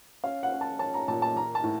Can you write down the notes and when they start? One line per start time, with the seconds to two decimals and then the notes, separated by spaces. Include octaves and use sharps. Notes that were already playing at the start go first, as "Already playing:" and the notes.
0.24 C#4 F5
0.43 F#5
0.52 C#4
0.61 A5
0.79 C#4 A5
0.94 A#5
1.08 A#2 A5
1.22 A5
1.36 A#3 A#5
1.55 A5
1.64 A2